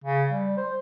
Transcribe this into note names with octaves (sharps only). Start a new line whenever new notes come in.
C#3
G3
C5